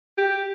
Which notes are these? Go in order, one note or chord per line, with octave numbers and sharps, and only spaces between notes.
G4